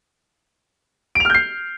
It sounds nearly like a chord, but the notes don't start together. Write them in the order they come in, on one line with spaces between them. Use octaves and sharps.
D7 F7 F6 G6 C7